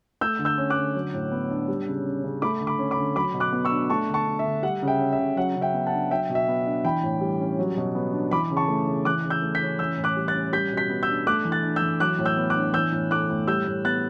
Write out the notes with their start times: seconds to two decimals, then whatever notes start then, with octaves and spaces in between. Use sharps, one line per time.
0.21 A3 E6 G6
0.39 D3
0.45 E6 G6
0.58 C#4
0.70 D6 F#6
0.77 D3
0.94 F#3
1.14 A2
1.32 B3
1.50 D4
1.68 G3
1.88 C#3
2.06 C#4
2.24 C#3
2.42 A3 B5 D6
2.61 D3
2.67 B5 D6
2.79 C#4
2.91 B5 D6
2.97 D3
3.15 F#3 B5 D6
3.34 B2
3.40 D6 F#6
3.53 B3
3.65 C#6 E6
3.71 D4
3.90 A3 A5 C#6
4.08 D3
4.14 A5 C#6
4.27 D4
4.39 E5
4.45 D3
4.63 G3 F#5
4.82 C#3
4.88 E5 G5
5.00 C#4
5.13 E5
5.19 C#3
5.37 F#3 F#5
5.56 C#3
5.61 E5 G5
5.74 B3
5.86 F#5 A5
5.92 D4
6.10 F#3 E5 G5
6.30 B2
6.35 E5
6.48 B3
6.66 D4
6.84 E3 G5 B5
7.03 A2
7.21 G3
7.40 C#4
7.59 F#3
7.77 B2
7.95 B3
8.13 D4
8.31 E3 B5 D6
8.51 C#3
8.57 A5 C#6
8.68 A3
8.87 C#3
9.05 E3 D6 F#6
9.24 C#3
9.30 E6 G6
9.42 A3
9.55 G6 B6
9.62 C#4
9.79 E3 E6 G6
9.97 A2
10.04 D6 F#6
10.17 G3
10.28 F#6 A6
10.34 C#4
10.53 G3 G6 B6
10.72 B2
10.77 G6 B6
10.90 B3
11.03 E6 G6
11.09 D4
11.26 A3 D6 F#6
11.45 E3
11.52 F#6 A6
11.63 D4
11.76 E6 G6
11.82 E3
12.00 F#3 D6 F#6
12.18 A2
12.25 E6 G6
12.37 B3
12.50 D6 F#6
12.56 D4
12.74 E3 E6 G6
12.92 A2
13.11 A3 D6 F#6
13.29 A2
13.47 G3 E6 G6
13.66 A2
13.85 B3 F#6 A6